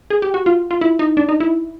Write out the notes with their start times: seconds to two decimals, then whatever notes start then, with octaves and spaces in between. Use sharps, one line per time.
0.10 G#4
0.22 G4
0.34 F#4
0.46 F4
0.71 F4
0.81 E4
0.99 D#4
1.17 D4
1.29 D#4
1.40 E4